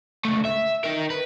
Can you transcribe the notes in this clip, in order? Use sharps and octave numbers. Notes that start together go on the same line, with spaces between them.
C#2 A3
E5
D#4 A#4
B4